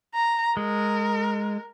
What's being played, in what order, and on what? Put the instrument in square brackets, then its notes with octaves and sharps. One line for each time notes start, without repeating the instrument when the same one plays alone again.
[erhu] A#5
[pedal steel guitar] G#3 [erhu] A#4